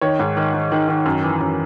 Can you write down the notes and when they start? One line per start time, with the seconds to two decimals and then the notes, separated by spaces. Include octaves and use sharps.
0.01 D#3 C#5
0.19 G#2
0.37 D#3
0.54 D#3
0.72 D#3
0.88 D#3
1.06 F#2
1.23 E3
1.40 F#2